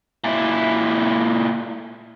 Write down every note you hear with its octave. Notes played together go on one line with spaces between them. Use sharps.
A#2 E4